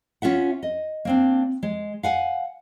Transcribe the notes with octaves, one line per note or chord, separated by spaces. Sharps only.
C#4 F4 E5 F#5
D#5
A#3 C4 D4
G#3
F5 F#5 G#5